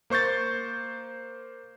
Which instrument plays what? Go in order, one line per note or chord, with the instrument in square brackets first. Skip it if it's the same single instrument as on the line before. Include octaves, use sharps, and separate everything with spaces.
[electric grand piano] A#3 C5 C#6 G6 A6